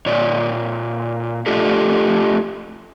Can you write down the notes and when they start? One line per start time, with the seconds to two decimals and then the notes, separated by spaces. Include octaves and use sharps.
0.06 A#2 C#5 D5
1.46 A3 D4 F4 G4 A4